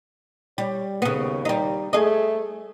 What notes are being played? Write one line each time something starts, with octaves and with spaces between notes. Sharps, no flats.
G3 C#5
D#2 C#3 B3
G3 D#4
A3 G#4 D#5